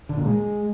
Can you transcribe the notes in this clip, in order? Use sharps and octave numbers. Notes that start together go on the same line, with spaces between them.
D3
A#2
G#3